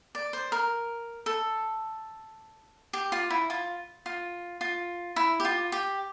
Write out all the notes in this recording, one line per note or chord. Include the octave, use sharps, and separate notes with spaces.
D5
C5
A#4
A4
G4
F4
E4
F4
F4
F4
E4
G4
F4
G4